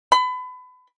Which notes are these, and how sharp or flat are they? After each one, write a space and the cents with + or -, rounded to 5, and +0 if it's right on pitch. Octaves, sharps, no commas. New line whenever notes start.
B5 +30